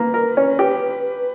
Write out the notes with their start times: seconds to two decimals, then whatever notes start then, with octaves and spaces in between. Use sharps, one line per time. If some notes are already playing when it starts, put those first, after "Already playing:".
Already playing: A#3 B4
0.14 A#4
0.37 C#4
0.59 G4